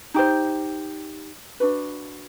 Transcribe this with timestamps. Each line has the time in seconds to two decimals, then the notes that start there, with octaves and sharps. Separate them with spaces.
0.14 D#4 G4 C5
1.60 D4 F#4 B4